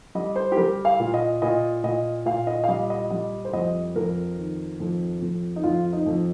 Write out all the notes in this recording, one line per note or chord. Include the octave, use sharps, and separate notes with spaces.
G3 D#5
C5
G4
G3 A#4
F5
A#2
D#5
A#2 D#5
A#2 D#5
A#2 F5
D#5
F5
G3 D#5
D#5
G3 D#5
C5
F2 D#5
F2 A#4
D#3
F2
F2
D#4
F2 F4
D#4
F2